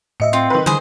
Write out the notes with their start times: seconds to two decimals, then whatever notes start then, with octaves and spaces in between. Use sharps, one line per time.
0.20 A2 D#5 E5 C#7
0.33 C4 F4
0.50 D#3 B4
0.66 D3 E3 G3 G#4 C5